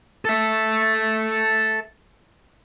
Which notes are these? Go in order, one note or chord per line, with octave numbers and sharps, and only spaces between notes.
A4 E5